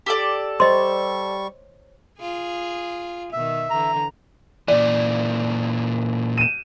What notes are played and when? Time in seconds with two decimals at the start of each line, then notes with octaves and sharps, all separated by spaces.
0.06 G4 A4 D5
0.60 G3 C5 C#5 D#5 C6 C#6
2.19 F4 G#4
3.33 B2 D#3 E5
3.71 D3 E3 A#5
4.68 A#2 E3 D5
6.38 D#7 E7